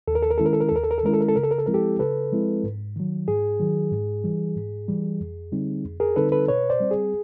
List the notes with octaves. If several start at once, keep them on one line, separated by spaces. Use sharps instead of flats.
D#2 A4
A#4
A4
A#4
D#3 G#3 C#4 E4 A4
A#4
A4
A#4
A4
D#2 A#4
A4
A#4
A4
D#3 G#3 C#4 E4 A#4
A4
A#4
A4
C#3 A#4
A4
A#4
A4
F3 G#3 C4 E4 A#4
G4 A4
C#3 A4 B4
F3 G#3 C4 E4
G#2
D#3 F#3
G#2 G#4
D#3 F#3
G#2
E3 G3
G#2
E3 G3
F2
D3 G3 C4 D#4
F2
G#4 A#4
D3 G3 C4 D#4 A4 B4
A4 B4
B2 B4 C#5
C5 D5
G3 C4
G#4